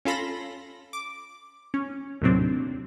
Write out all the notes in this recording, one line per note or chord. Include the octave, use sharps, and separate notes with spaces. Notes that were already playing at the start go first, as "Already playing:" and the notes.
C#4 F4 A4 B5 C6 A#6
D6
C#4
D#2 A2 C3 F#3 C4 D4